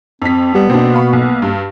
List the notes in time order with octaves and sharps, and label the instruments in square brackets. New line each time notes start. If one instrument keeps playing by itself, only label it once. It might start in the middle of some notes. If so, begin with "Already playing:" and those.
[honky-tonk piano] F2 B6 [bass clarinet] C4
[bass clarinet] G3 [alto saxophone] B3 [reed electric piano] G4
[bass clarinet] B2 [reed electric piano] A#3 [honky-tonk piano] C4 D4
[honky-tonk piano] F5 B5 C#6
B1
G2